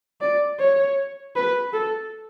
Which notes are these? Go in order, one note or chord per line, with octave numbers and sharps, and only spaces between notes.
D5
C#5
B4
A4